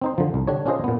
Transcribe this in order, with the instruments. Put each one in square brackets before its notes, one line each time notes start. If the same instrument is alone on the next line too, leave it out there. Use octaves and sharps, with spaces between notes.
[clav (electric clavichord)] C4 D#4 C5
D3 F3
C2
D3 D4 G4 C#5
C#4 D4 F4 G#4 C5 D#5
A#2 B3